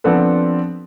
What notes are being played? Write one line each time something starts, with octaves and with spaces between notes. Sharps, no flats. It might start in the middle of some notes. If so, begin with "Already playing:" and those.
F3 B3 C4 D4 A4 B4